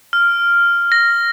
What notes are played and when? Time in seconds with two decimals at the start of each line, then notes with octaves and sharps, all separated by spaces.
0.13 F6
0.92 A#6